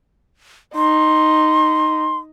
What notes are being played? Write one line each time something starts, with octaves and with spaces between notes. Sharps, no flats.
D#4 C6